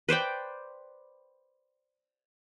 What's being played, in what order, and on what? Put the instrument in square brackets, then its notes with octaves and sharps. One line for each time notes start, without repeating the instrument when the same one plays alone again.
[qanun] B4 C5 D5 G5